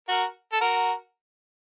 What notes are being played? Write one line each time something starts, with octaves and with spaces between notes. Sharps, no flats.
F#4 A#4
A4
F#4 A#4